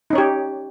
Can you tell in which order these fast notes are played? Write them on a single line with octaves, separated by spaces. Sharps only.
D#4 C#4 C#5 G4